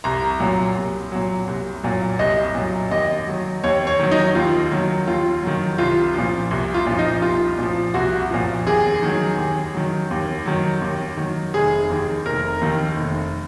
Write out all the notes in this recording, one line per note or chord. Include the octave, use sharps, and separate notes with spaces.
C2 A#5
A#2 F#3
C2
A#2 F#3
C2
A#2 F#3
C2 D#5
A#2 F#3
D#2 D#5
D#3 F#3
D#2 C#5
C#5
D#3 F#3
D#4
D#2 F4
D#3 F#3
D#2 F4
D#3 F#3
C2 F4
A#2 F3
C2
F4
A#2 F3
D#4
C2 F4
A#2 F3
C2 F#4
A#2 F3
D#2 G#4
D#3 F#3
D#2
D#3 F#3
D#2
D#3 F#3
D#2
D#3 F#3
F1 G#4
D#2 D#3
F1 A#4
D#2 D#3
F1